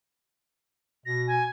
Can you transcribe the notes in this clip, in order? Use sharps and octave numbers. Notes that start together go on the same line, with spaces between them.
B2 A#6
G#5